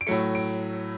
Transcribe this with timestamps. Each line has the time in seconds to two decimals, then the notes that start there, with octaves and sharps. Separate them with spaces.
0.01 D7
0.07 A2 F#3 A3 C#7
0.35 D7